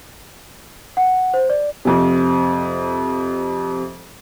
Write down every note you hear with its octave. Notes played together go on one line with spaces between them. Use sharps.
F#5
C5
D5
F2 C3